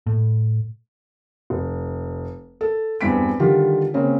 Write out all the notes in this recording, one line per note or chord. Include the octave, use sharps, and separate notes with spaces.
A2
F1
A4
E2 G2 C4 B6 D7
D3 D#3 G3 F4 G4
C#3 A#3 C4 C#4